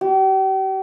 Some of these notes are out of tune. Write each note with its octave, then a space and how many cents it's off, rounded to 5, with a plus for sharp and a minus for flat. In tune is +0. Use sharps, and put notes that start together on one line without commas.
G4 -40